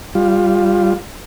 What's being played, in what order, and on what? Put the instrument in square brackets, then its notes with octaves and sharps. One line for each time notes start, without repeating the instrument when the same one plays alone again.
[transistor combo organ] G3 F4